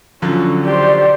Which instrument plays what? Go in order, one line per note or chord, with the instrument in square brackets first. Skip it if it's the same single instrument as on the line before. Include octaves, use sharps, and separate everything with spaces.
[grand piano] D3 F3 F#3 [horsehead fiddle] C#4
[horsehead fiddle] G4 C5 [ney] D5